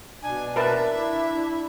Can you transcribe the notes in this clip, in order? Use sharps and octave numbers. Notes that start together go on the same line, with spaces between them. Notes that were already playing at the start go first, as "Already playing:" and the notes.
B2 D4 G#5
A#4 B4 E5 A5
E4